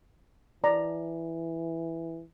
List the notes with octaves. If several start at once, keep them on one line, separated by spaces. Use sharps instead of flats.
E3 D5 A#5